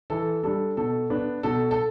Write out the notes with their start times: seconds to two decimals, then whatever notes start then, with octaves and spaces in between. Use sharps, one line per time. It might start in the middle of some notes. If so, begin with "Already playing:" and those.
0.10 E3 A4
0.43 G3 D4 A4
0.77 B2 A4
1.10 B3 D4
1.43 B2 A4
1.71 A4